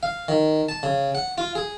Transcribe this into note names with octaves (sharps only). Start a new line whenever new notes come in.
F5
D#3
A5
C#3
F#5
F4
G#4